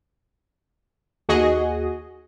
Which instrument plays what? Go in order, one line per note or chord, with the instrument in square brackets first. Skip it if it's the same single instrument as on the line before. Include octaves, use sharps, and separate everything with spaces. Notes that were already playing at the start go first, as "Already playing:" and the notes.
[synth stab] D#2 F#4 G#4 D#5